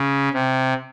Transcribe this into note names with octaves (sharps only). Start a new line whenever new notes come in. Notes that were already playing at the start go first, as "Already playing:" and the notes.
Already playing: C#3
C3